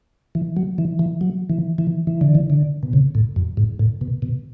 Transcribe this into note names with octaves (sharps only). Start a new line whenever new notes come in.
E3
F#3
E3
E3
F#3
E3
E3
E3
D3
E3
D3
B2
C#3
A2
F#2
G#2
A2
B2
B2